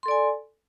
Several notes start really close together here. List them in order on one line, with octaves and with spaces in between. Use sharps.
C6 A4 D5 G#5